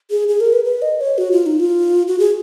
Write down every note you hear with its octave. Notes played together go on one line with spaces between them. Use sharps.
G#4
G#4
A#4
B4
B4
D#5
C#5
F#4
F4
D#4
F4
F#4
G#4